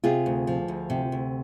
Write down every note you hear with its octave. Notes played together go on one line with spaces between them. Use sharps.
C3 F4 G#4
D2
F3
D2
C3
D2